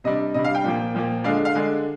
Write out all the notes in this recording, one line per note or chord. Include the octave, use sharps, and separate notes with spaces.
C3 G3 D4 D#5
C3 G3 D4 D#5
F5
G5
A#2 F3 A#3
A#2 F3 A#3
D3 G#3 D4 F5
F5
D3 G#3 D4